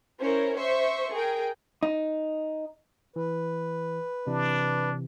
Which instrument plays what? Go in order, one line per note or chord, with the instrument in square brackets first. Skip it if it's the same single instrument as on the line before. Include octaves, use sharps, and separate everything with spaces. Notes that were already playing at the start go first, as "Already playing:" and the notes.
[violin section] C#4 E4 A#4 C5 C#5
C5 E5 C6 C#6
G#4 A#4 G5
[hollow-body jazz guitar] D#4
[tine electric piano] E3 [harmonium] B4
[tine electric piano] C3 E3 [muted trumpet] D4